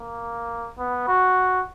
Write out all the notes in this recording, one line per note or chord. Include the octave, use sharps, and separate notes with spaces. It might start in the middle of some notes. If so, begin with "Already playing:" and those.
Already playing: A#3
B3
F#4